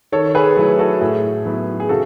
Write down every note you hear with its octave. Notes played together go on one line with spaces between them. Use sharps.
D#3 A4 C#5
G#4 B4
F#3 A3 E4 G#4
F#4 A4
A2 G#4
F#3 B3 E4
G#4
C#3 F#4 A4